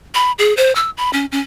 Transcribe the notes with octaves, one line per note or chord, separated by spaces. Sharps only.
B5
G#4
C5
E6
B5
C#4
C#4